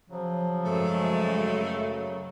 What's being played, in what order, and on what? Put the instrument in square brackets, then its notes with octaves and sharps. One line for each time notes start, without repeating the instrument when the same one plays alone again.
[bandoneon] C#3 F#3 [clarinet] F3
[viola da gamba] F#2 G#3 [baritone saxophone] A3